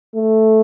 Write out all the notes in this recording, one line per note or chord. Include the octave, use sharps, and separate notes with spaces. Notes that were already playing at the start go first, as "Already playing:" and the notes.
A3